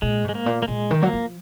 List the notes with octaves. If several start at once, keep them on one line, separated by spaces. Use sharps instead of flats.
A#2 G#3
G#2 G#3
A#3
A#2
A#3
A#2 G#3
D#3
F#3 A#3
F3